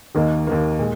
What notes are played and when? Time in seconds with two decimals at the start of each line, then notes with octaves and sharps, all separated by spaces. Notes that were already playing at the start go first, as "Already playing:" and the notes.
0.15 D#2 D#3 A#3
0.47 D#2 D#3 A#3
0.79 A#2 G#3